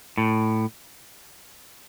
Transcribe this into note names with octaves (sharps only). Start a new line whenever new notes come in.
A2